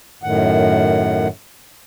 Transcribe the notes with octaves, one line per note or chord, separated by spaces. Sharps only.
F#2 A2 D#3 F#5